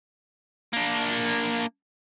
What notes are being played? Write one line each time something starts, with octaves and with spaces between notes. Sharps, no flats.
A#3 D4